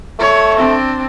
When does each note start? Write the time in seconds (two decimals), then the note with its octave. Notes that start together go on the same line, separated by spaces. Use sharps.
0.19 A3 C#5
0.56 C4 D4